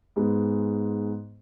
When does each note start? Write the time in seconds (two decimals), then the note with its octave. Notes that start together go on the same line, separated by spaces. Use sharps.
0.16 G#2 G#3 B3